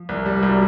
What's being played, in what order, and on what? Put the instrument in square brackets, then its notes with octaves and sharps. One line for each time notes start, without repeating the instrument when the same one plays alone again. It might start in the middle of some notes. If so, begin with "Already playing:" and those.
Already playing: [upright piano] F3
[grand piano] C2
G3
[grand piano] C2 [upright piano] F#3